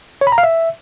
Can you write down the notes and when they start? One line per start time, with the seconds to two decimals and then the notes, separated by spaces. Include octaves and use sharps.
0.21 C#5
0.27 B5
0.32 A#5
0.38 F5
0.43 E5